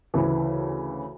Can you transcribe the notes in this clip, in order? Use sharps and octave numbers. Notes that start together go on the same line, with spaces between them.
D2 C#3 E3